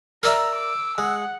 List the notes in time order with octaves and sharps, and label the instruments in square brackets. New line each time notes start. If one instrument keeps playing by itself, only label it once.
[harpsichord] A#4 D5 E5 [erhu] A#5 [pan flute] E6
[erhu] D6
[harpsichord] G#3 [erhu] F#5